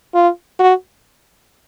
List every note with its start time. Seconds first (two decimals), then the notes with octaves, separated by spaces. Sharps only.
0.15 F4
0.59 F#4